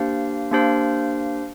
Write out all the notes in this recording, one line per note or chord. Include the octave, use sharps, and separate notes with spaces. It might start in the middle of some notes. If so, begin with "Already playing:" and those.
Already playing: A#3 D4 G4 C5 F5
A#3 D4 G4 C5 F5